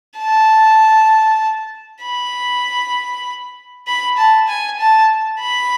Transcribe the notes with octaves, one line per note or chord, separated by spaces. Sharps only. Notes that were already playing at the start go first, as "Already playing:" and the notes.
A5
B5
B5
A5
G#5
A5
B5